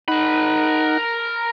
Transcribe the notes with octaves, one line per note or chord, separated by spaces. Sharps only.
D#4 A#4 F#5 B5